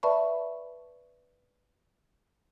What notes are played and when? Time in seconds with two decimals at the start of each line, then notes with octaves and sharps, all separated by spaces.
0.03 B4 D5 E5 A5 B5 C#6